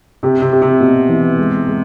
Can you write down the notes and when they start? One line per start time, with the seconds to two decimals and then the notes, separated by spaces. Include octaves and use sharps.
0.23 C3 G4
0.42 C3
0.53 G4
0.62 C3
0.80 B2 G4
1.09 E3
1.38 G#3
1.68 G#3